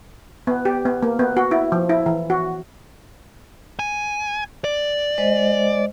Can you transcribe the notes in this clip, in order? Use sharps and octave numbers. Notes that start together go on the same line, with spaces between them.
B3
G4
B3
A#3
B3
F#4
E4
F3
E4
E3
F#4
G#5
D5
G#3 C5 D#5